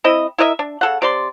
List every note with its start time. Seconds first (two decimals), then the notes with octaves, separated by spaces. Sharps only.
0.04 C4 E4 D#5
0.38 E4 A#4 D#5 E5
0.59 D4
0.81 C#3 A4 F#5
1.02 C3 D5 C6